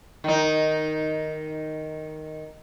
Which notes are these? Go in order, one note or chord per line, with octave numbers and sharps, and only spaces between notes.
D#3 D#4